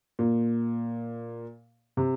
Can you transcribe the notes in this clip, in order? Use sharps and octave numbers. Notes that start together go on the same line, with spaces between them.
A#2
C3